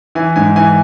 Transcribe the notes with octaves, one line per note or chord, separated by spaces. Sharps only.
E3 G#5
G#2 G#5
E3 G#5